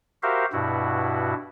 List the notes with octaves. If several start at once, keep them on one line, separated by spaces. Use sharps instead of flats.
F#4 G4 A#4 C5 E5 F5
G2 B2 E4 F#4